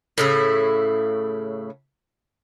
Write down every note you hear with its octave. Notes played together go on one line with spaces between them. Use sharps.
A2 C#3 E4